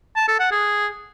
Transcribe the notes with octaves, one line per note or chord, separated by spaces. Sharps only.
A5
A4
F#5
G#4